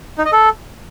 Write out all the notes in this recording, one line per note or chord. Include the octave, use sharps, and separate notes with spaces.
D#4
D#5
A4